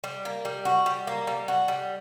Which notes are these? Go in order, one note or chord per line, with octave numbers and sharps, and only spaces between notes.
G3
A#3
G3
F#4
G3
A#3
G3
F#4
G3